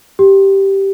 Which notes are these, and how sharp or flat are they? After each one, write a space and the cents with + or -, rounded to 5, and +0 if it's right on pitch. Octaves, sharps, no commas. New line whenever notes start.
G4 -5